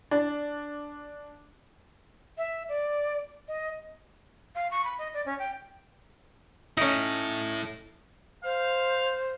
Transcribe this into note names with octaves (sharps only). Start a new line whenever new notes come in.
D4
E5
D5
D#5
F5
C#6
B5
D#5
D5
C#4
G5
C#4 D#4 E4 A4
C5 F5